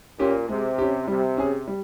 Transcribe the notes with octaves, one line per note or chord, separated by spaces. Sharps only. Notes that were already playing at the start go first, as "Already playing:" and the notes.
A#2 C#4 G4
C3 G#3
C#4 G4
C3 G3
C#4 G#4
G3